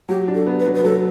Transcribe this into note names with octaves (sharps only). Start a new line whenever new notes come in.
F#3 G4
D4
A4
B3
B4
F#3
B4
F#3 A4